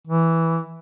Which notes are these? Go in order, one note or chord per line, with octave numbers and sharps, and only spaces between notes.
E3